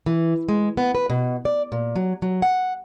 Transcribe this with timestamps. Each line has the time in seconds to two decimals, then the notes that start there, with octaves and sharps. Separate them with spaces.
0.06 E3
0.49 G#3
0.77 B3
0.95 B4
1.10 B2
1.45 D5
1.72 A#2
1.96 F#3
2.22 F#3
2.42 F#5